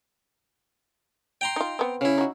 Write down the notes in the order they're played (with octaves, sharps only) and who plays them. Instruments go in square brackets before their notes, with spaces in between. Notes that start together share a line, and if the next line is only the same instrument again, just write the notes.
[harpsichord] G5 A#5 C6
[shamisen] D#4 F4
B3 C4
[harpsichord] C#3 E4
[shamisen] D#4 F#4